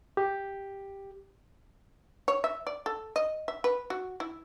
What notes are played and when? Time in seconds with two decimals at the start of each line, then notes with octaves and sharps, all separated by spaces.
0.17 G4
2.28 C#5
2.44 E5
2.67 D5
2.86 A4
3.16 D#5
3.48 E5
3.64 B4
3.90 F#4
4.20 E4